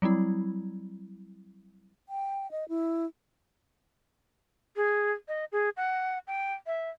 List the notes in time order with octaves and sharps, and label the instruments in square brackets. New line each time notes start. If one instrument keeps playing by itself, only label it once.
[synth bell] F#3 G3 C4 E4
[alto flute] G5
D#5
E4
[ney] G#4
D#5
G#4
F#5
G5
E5